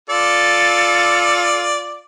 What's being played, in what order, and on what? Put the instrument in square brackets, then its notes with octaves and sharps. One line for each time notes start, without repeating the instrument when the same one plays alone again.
[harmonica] F4 D5 [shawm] A4